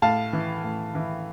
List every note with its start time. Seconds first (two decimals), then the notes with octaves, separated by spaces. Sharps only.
0.02 A2 F5 A5
0.33 E3
0.64 A2
0.95 E3